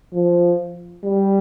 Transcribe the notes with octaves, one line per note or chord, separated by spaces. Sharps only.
F3
G3